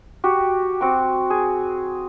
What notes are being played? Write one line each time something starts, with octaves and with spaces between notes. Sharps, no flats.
F#4 G4
C4 F#4 D6
G#4